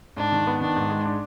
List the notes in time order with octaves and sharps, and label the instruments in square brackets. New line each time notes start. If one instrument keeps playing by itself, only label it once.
[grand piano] G#2 [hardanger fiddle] D4
[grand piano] D#3
B3
[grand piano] D#3 [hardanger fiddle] D4
[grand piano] G#2
G#3
D4